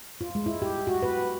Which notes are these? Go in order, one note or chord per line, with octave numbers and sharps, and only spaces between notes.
F4
G#3
E4
G4
F#4
B4